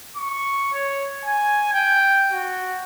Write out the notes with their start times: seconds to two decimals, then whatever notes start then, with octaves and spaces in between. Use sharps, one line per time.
0.16 C#6
0.73 C#5
1.25 G#5
1.73 G5
2.32 F#4